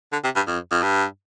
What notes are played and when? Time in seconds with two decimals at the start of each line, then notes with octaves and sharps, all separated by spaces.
0.12 D3
0.24 C3
0.36 G2
0.47 F2
0.71 F2
0.82 G2